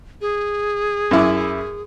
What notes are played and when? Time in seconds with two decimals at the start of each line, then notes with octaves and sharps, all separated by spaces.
0.21 G#4
1.11 F#2 E4 D6